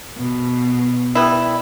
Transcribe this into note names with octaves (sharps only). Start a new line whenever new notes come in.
B2
G3 B3 E4